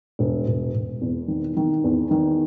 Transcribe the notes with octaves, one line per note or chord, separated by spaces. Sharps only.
E1
E1
E1
E2
D#3
D#3
E2
D#3